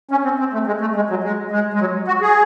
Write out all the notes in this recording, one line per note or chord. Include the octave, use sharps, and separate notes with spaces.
C#4
C4
C4
A3
G#3
A3
G#3
F#3
G#3
G#3
G#3
F#3
F#4
G#4